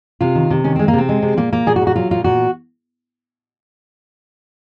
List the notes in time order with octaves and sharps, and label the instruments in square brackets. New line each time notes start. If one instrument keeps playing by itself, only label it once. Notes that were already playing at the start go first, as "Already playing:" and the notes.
[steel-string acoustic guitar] C3 F4
D#3
C3
D#3 C#4
G#3 C4
A#3
C3 C4
G#3
C3
A#2 A#3
A#2 A#3
A#2 G#4
F#4
A#2
F#4
F#3 F4
A#2 F4
A#2 F#4